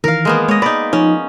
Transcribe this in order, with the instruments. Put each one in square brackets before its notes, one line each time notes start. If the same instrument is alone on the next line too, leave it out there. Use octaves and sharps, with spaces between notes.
[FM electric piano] D#3 E3 [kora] A#4 F5
[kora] G#3 A#3 B3
[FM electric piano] G#3 [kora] C#5 D#5
[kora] D#4 D5 [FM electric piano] B5
[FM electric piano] F3 D#4 [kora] C#4